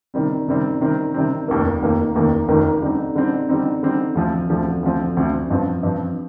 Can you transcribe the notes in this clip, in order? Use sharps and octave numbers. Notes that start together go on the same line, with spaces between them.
C3 D#3 G3 C4
C3 D#3 G3 C4
C3 D#3 G3 C4
C3 D#3 G3 C4
F1 D#2 D#3 A#3
F1 D#2 D#3 A#3
F1 D#2 D#3 A#3
F1 D#2 D#3 A#3
D3 G3 C4 D#4
D3 G3 C4 D#4
D3 G3 C4 D#4
D3 G3 C4 D#4
D2 D3 F3 C4
D2 D3 F3 C4
D2 D3 F3 C4
D2 D3 F3 C4
G2 F3 C4
G2 F3 C4